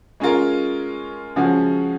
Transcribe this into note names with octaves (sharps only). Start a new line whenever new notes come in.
G#3 C#4 F4 A#4
C#3 F3 G#3 C#4 F#4